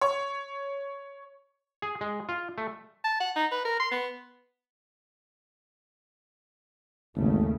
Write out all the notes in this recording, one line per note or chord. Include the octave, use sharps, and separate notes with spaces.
C#5
G#4
G#3
F4
A3
A5
F#5
D#4
B4
A#4
C6
B3
G#1 D#2 C#3 A3